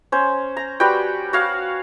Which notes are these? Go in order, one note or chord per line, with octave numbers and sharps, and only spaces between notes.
C#4 C5
A#5
G3 F#4 B4 G5
F#4 C#5 F5